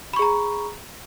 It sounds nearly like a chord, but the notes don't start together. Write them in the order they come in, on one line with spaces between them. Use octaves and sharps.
B5 C#6 G#4 A#5